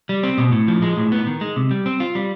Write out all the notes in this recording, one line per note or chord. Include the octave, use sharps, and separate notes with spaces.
G3
C4
B2
A2
F3
G#3
A2
B3
D#3
G#3
C3
G3
C4
F4
G3